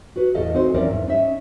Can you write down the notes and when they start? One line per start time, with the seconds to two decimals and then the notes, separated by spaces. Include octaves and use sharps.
0.16 F#4 B4
0.35 E2 A2 A4 D#5 F5
0.53 C4 D#4 F#4 C5
0.74 F2 E3 C4 C#4 A#4 D5
0.90 E2 G#2
1.07 C#4 D#4 E5